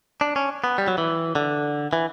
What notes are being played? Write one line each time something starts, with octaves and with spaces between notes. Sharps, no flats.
D4
C#4
B3
G3
F#3
E3
D3
E3